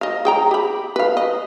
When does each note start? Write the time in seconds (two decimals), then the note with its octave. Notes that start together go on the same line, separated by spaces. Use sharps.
0.01 D#5 F5
0.25 G#4 G5 A#5
0.51 G4 B5
0.96 B4 F5
1.17 D#5